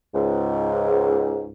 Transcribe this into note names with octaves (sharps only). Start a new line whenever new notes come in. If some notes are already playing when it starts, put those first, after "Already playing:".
C#2 G#2